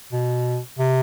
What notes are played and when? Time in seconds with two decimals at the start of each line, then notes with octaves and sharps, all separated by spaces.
0.12 B2
0.79 C3